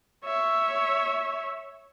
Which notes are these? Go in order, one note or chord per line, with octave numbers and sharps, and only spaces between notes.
C#5 E5